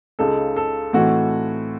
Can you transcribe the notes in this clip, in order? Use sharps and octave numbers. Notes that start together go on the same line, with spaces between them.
C#2 C#3 G#3 D#4 A4
A4
A2 E3 A3 C4 D#4 F#4